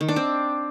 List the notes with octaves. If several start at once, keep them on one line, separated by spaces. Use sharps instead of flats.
D#3
D4
C4